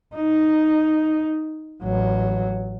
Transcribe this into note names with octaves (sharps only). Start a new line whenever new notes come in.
D#4
A1 F#3